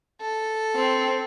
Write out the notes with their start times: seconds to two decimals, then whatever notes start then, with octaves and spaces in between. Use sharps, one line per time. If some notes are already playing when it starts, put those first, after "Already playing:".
0.21 A4
0.76 C4